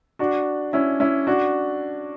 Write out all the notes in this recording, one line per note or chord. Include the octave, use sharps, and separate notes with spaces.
D4 F#4
C#4 E4
C#4 E4
D4 F#4